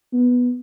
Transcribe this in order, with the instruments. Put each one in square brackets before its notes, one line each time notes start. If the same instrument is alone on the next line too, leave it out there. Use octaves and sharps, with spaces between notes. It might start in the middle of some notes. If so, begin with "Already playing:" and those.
[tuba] B3